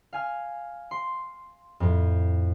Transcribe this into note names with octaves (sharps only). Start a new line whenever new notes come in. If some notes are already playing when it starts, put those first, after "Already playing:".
F5 G#5 F6
C6
F2 A2